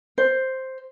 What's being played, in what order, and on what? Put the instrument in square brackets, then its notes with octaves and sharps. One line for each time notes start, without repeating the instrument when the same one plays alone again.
[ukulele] C5